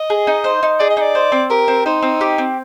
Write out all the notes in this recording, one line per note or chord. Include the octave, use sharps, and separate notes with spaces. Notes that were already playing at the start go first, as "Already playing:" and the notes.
Already playing: D#5
G#4
D#4
C5
D#4
G#4 D5
D#5
D#4 D5
C5
C4
G4 A#4
C4
D#4 C5
C4
G4
C4